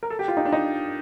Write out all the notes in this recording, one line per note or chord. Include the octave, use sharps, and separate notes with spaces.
A#4
A4
G4
F4
D#4
D4
D#4